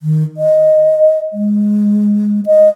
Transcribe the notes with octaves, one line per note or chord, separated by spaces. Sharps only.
D#3
D#5
G#3
D#5